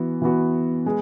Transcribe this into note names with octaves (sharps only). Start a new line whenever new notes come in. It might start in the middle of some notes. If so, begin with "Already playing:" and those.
Already playing: E3 B3 F#4
E3 B3 F#4
G#3 B3